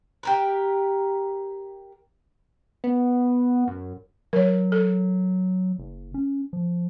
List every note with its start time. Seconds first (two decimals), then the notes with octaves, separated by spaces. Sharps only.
0.23 G4 A#4 B4
2.84 B3
3.67 F#2
4.33 F#3 A#4 C#5
4.72 A4
5.78 F#1
6.14 C#4
6.53 F3